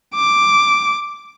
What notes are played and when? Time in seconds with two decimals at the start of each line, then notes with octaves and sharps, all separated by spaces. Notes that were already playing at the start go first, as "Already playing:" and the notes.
0.15 D6